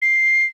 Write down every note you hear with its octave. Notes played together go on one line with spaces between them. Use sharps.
C7